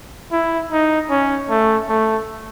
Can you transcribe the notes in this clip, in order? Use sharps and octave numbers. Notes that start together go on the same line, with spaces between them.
E4
D#4
C#4
A3
A3